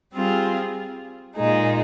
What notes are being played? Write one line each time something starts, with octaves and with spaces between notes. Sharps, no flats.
G3 C4 F4 G#4
A#2 G#3 D#4